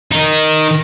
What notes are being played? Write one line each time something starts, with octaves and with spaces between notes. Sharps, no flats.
D#3 D#4